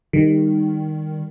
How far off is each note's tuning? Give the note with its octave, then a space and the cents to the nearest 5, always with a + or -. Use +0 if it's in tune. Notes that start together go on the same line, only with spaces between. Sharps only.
D#3 -5 G3 +25